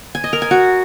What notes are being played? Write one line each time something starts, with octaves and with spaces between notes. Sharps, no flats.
G#5
D#5
A#4
G#5
F#4